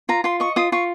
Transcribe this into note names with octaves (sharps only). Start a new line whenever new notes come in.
F4 A#5
F4 C6
D#5 C#6
F4 D#6
F4 C#6